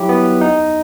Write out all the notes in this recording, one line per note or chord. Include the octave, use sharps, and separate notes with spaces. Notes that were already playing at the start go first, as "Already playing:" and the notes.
Already playing: F#3 E4 G4
B3
D#4